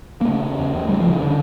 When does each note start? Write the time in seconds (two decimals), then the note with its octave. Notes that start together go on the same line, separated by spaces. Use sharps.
0.21 A#3
0.26 C#3 A3
0.43 C#3
0.58 E2
0.74 E2
0.89 C#3 G3
1.00 C#3 F3
1.10 E3
1.21 D3